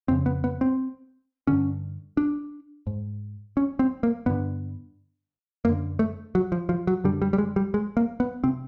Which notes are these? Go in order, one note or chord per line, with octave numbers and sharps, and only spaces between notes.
F2 C#3 C4
B3
B3
C4
G2 D3 C#4
D4
G#2
C#4
C4
A#3
G2 D3 B3
F#2 D3 A#3
A3
F#3
F3
F3
F#3
F#2 D3 G3
G3
G3
G#3
G3
G#3
A#3
B3
C3 C4